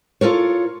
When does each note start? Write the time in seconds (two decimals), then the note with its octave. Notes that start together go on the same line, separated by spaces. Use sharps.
0.21 F4 A4 A#4 C#5